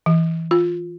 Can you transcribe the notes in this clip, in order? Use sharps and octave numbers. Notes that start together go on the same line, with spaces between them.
E3
F4